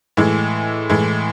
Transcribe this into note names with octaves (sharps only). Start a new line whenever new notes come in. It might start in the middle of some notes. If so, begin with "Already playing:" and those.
A2 E3 G#3
A2 E3 G#3